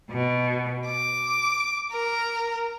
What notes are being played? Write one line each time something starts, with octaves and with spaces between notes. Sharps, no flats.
B2
D6
A#4